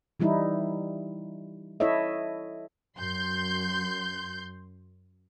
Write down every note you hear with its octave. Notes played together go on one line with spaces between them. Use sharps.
E3 G3 D#4 E4
E4 A4 C#5 D#5 E5
F#2 C6 G6